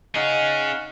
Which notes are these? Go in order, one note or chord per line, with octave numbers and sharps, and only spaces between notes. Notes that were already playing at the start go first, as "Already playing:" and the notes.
C#4 D#4 G#4 F5 F#5